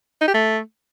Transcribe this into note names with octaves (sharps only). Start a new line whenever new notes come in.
D#4
G4
A3